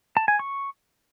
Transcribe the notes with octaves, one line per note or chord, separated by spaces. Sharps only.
A5
G#5
C#6